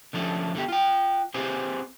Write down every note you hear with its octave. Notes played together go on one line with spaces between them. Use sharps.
D3 F3 A3 C#4
D3 A3 B3 G4
F4 G5
C4 G4 G#4 B4 C5